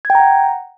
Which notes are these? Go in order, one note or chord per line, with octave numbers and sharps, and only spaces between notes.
G#6
G5
A#5
F#5